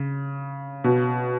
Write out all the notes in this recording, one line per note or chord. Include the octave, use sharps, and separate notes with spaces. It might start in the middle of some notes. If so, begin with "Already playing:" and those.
Already playing: C#3
B2